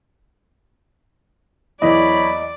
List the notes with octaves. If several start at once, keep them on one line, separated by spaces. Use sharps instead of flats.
E2 E3 F#3 E4 D5 D#5 B5